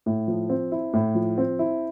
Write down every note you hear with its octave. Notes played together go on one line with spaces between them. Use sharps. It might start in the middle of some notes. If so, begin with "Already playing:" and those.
A2
F3
C4
E4
A2
F3
C4
E4